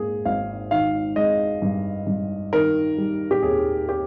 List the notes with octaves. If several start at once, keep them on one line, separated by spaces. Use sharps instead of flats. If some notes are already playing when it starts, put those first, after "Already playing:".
Already playing: G#2 A#3 G#4
G#1 F5
D#3 F5
G#3 D#5
G2
G2
D#3 A#4
G3
G4
D#2 G#4
G4